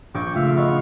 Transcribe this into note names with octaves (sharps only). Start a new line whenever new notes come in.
A#1 G5 C#6 D6
C#3 A3 F4 E5 F5
A#1 B3 D#5 F5 C#6